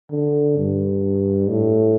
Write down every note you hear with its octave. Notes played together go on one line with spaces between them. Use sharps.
D3
G2
A2